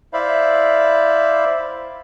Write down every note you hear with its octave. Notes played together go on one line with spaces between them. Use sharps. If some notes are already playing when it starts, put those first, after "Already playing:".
E4 C5 D5 E5 F5 B5